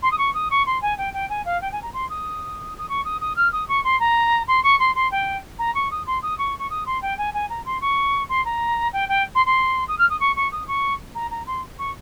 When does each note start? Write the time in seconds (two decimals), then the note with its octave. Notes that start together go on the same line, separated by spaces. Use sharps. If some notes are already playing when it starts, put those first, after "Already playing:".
0.02 C6
0.11 D#6
0.18 C#6
0.34 D#6
0.51 C#6
0.66 C6
0.82 G#5
0.98 G5
1.14 G5
1.30 G#5
1.45 F5
1.61 G5
1.72 G#5
1.82 A#5
1.93 C6
2.09 D#6
2.78 D#6
2.89 C#6
3.05 D#6
3.21 D#6
3.36 F6
3.52 D#6
3.68 C#6
3.84 C6
4.00 A#5
4.48 C6
4.63 C#6
4.79 C6
4.95 C6
5.11 G5
5.59 A#5
5.75 C#6
5.91 D#6
6.06 C6
6.22 D#6
6.38 C#6
6.59 C#6
6.70 D#6
6.86 C6
7.02 G5
7.18 G#5
7.34 G#5
7.49 A#5
7.66 C6
7.81 C#6
8.29 C6
8.45 A#5
8.93 G5
9.09 G5
9.35 C6
9.46 C6
9.88 D#6
9.98 F6
10.10 D#6
10.20 C#6
10.36 C#6
10.52 D#6
10.67 C#6
11.15 A#5
11.31 A#5
11.47 C6
11.78 C#6